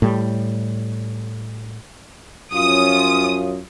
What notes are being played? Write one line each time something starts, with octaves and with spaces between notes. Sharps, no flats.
A2 G3
F#2 F3 C#4 F4 D#6